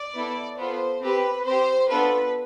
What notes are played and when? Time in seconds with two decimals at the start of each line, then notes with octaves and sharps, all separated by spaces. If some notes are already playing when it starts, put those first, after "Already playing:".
Already playing: D5
0.14 B3 E4 A4
0.58 B3 F4 A4 C5
1.01 C4 G4 B4
1.45 C4 G4 C5
1.89 B3 D4 F4 A4 B4